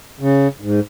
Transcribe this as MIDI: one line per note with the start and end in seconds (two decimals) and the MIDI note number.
0.20 0.48 49
0.61 0.80 44